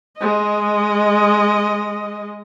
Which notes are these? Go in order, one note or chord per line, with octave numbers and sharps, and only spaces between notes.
G#3 D#5